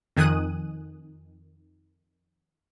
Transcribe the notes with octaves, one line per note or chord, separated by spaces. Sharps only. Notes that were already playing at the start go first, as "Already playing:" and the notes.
F2 D#3 G#5 D#6 F#6 D#7